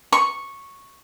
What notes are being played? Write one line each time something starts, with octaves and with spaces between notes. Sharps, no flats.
C#6